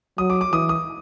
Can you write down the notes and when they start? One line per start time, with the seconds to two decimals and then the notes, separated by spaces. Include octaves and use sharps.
0.18 F#3 D#6
0.30 D6
0.41 D6
0.52 E3 D#6
0.69 D#6